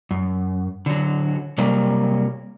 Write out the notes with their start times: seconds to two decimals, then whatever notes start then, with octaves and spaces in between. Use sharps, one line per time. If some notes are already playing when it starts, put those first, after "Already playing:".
0.11 F#2
0.86 D3 F#3
1.58 C3 F#3 G3 A#3